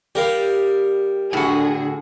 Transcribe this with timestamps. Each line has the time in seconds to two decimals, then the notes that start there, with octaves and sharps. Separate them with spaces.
0.15 G3 G4 A#4 F5
1.33 A2 D3 F#4 G#4